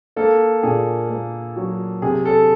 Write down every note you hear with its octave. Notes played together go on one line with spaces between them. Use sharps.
A#3 A4
A#2 G#4
A#3
F#3
C3 G#4
A4